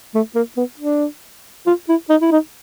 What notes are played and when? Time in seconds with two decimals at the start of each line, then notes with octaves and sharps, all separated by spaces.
0.15 A3
0.35 A#3
0.57 B3
0.79 D4
1.67 F4
1.89 E4
2.10 D#4
2.22 E4
2.32 D#4